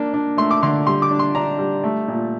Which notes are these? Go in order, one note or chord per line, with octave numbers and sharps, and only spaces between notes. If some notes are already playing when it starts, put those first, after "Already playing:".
Already playing: A#3 D4
D4
A3 C6
D6
D3 C6
G3 C6
D6
D4
C6
D4 A#5
G3
A3
A#2